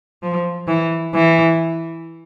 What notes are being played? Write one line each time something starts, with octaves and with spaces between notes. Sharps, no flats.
F3
E3
E3